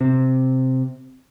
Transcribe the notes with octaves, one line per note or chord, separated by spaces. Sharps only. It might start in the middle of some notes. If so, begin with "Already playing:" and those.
C3